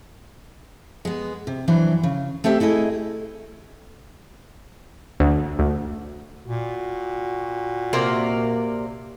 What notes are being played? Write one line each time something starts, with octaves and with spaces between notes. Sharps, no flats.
G#3 B3
C3
E3 F#3 D4 C5
C#3
A3 C4 G4 E5
A3 E4 G#4 D#5
D2
D2
A#2 F#4
C3 A#3 D5